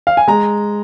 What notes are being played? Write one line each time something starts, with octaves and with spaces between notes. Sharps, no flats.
F5
G#5
G#3 A#5